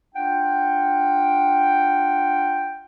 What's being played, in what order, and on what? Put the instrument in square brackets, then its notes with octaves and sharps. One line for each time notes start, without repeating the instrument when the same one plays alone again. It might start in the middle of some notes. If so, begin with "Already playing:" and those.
[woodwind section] D4 F4 F#5 G5